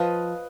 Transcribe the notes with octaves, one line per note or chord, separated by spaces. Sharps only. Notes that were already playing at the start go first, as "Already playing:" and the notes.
Already playing: F3 B4 D#5